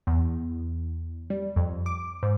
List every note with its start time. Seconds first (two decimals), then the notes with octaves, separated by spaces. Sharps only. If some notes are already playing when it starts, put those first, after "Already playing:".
0.07 E2
1.30 G3
1.56 F2
1.86 D6
2.23 G#2